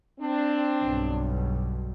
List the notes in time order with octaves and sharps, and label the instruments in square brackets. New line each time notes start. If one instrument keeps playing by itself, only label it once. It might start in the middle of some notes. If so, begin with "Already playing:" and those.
[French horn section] C4 D4
[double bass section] B1 G2